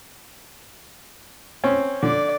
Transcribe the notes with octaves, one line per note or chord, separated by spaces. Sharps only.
C4 C#4
D3 D5